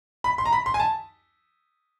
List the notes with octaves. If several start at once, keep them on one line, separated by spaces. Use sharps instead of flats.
B5
C6
A#5
B5
C6
G#5
A5